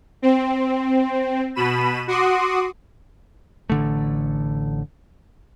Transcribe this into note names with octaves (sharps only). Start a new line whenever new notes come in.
C4
B2 B5 D#7 E7
F#4 C6 D6 D#6
A1 D3 A3